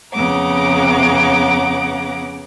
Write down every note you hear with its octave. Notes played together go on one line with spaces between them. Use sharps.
F2 C#3 B3 F#5 A#5 D6